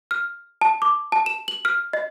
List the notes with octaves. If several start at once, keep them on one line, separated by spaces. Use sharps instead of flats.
F6
A5
D6
A5
E7
F#7
F6
D#5